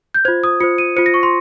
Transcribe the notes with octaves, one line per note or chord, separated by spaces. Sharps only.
G6
F4 C5 G#6
D#6
F4 C5 C#7
D#7
F4 C5 C#7
A#6
C#6
C6